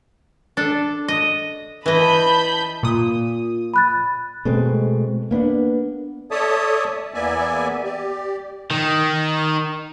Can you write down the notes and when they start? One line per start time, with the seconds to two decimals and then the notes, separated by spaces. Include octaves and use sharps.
0.57 D4 A4
1.08 D#5
1.86 E3 D#5 A5 B5 G6
2.83 A#2 D#6
3.74 B5 F#6 A6
4.45 B2 G#3 A3 C4
5.31 A#3 B3 C#4 D4
6.31 A4 C#5 D5 E5 A5 D#6
7.14 E2 A#3 B3 D5 E5 G#5
7.84 G4 D5
8.71 D#3